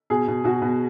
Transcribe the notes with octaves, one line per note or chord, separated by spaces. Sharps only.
B2 G#4
B2
B2 F#4
B2